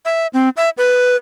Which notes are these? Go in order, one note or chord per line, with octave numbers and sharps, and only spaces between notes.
E5
C4
E5
B4